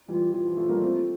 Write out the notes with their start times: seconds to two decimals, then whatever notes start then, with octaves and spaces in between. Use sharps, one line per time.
0.08 E3 G3 F4
0.33 E3 F4
0.46 F3
0.57 F3 A3
0.69 G3 A#3
0.82 A3 C4